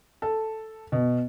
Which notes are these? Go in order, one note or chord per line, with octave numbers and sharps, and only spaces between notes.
A4
B2